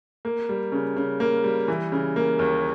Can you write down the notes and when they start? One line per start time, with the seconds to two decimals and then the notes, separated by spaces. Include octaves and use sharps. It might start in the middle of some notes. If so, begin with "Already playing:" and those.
0.25 A#3
0.49 G3
0.72 C#3
0.96 C#3
1.20 A#3
1.44 G3
1.68 E3
1.92 C#3
2.16 A#3
2.39 D#2